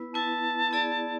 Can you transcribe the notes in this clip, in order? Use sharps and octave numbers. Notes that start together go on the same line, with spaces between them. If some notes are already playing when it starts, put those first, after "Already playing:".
Already playing: B3 E4 B4
B3 E4 B4 A5
B3 E4 G#4 D5